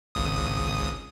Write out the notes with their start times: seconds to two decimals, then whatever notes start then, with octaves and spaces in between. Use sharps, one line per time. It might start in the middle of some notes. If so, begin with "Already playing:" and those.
0.15 G#1 C#2 D#6